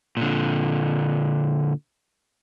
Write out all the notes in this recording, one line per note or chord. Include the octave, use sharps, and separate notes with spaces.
A#2 D3